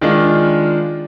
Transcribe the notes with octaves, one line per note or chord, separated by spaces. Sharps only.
D#3 G#3 D4 F4